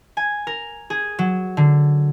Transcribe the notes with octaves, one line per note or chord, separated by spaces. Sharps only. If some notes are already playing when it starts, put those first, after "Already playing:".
G#5
A#4
G#4
F#3
D3